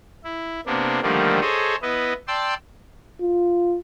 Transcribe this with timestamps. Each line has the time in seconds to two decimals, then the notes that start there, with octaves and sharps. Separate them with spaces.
0.24 E4
0.66 C3 A#3 B3 D4
1.02 D3 D#3 F3 G3 A3 A#3
1.41 G#4 A4 C5 C#5 D#5
1.82 B3 E4 B4 D#5
2.28 D5 G5 A5 C6 E6
3.21 F4